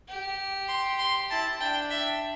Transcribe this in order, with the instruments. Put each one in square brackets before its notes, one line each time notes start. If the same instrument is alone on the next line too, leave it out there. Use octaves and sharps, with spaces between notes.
[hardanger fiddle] G4
[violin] C6
C6
[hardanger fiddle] E4 [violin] A5
[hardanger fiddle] D4 [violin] G5
[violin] E5